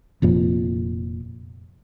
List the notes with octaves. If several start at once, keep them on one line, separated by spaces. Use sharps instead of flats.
F1 F2 A#2 F3